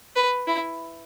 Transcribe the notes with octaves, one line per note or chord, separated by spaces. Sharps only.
B4
E4